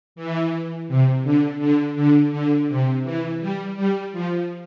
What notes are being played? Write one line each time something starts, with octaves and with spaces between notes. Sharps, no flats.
E3
C3
D3
D3
D3
D3
C3
E3
G3
G3
F3